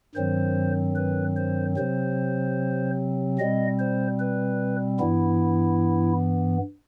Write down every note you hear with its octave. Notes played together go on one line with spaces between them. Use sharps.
G2 D#3 F#3 C4 C5
B4
C5
C3 F#3 C4 C5
B2 G3 C4 D#5
C5
B4
G2 E3 B3 E4